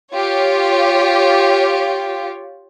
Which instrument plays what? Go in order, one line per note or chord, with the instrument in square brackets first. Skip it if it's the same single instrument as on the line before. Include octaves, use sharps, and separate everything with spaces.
[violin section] F4 G4 C#5